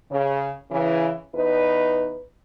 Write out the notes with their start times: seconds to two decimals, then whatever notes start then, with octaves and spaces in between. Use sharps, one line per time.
0.11 C#3
0.70 C#3 E3
1.35 E2 D#4 B4